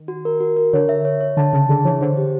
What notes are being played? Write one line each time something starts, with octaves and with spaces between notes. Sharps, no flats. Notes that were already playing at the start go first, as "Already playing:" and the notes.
Already playing: D#3
F#4
A#4
F#4
A#4
D3 C#5
E5
C#5
C#5
D3 A5
C#3 A5
D3 G#4
E3 C#5
D3 C5
G4